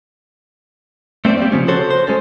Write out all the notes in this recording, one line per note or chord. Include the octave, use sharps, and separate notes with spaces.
A3 C4 C5 D5
G3 A#3 C4
C#3 F3 C#4
F#4 A4 C5 C#5
C5
G#3 C#4 A4